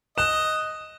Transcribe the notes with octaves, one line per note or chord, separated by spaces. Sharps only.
D#5 F#6 E7